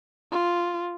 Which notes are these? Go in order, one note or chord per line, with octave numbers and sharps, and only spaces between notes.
F4